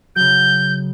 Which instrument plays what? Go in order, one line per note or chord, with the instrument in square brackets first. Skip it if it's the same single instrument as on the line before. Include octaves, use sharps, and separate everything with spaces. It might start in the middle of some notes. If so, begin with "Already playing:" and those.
[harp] C#3 F#3 [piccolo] G6